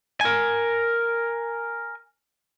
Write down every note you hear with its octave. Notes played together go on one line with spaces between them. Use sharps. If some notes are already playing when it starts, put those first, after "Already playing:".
A#4 G#5